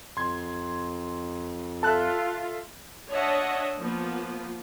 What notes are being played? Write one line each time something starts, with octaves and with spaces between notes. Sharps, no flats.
F2 C6 G#6
F4 A4 E5 A5 F#6
D4 C#5 D#5 E5 F#5 A5
F3 A#3 B3